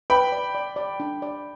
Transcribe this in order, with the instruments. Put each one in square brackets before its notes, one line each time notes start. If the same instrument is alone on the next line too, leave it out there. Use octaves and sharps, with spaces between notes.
[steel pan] B4 [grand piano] G5 B5
[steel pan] D5
D5
D5
D4
D5